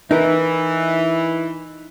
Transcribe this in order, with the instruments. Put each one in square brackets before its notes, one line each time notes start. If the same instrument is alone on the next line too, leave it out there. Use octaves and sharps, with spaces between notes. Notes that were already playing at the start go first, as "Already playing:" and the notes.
[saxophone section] E3 [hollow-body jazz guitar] D#4 A#4